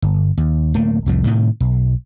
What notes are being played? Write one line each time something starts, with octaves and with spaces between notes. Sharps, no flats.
G1
D#2
D1 A3 A#3
C2 F2 A2
A2 C3 D#3
B1